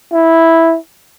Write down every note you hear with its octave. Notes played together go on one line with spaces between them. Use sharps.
E4